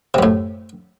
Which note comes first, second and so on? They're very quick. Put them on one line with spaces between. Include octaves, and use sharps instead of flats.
C3 F#2 A2